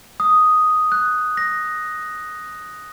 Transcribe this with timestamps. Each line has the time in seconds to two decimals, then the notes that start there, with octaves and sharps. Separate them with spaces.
0.20 D#6
0.92 F#6
1.37 A#6